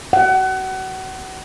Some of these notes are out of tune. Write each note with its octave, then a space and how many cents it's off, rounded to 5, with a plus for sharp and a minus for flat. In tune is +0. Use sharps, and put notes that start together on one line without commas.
F#5 +30